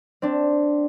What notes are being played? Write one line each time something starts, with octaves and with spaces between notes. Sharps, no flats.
C4 D4